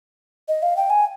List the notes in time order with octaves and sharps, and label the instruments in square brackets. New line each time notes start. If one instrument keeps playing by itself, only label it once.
[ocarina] D#5
F5
G5
G#5